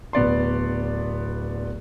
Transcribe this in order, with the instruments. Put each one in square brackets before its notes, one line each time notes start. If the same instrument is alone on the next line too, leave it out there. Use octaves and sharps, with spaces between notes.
[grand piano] D1 B3 D5 C6